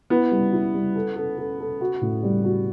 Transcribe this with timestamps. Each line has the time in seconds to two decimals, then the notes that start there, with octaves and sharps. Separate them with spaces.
0.10 B3 E4
0.31 G3
0.53 E4
0.75 G3
0.96 A4
1.16 A4
1.38 A4
1.60 A4
1.81 F#4
2.01 A2
2.23 G3
2.44 F#4